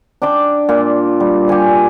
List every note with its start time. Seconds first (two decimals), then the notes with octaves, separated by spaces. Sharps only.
0.22 D4 G5 D6
0.69 A#2
1.20 G3
1.48 G4 F5 G#5 C#6